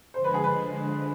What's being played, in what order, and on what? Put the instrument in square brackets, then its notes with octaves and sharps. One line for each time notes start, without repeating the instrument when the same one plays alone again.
[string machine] D3 F3 G#3 D4 [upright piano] C5
[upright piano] B4
G#4
B4